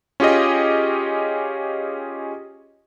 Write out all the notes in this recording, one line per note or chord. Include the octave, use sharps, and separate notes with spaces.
C#4 F4 G4 G#4 D#5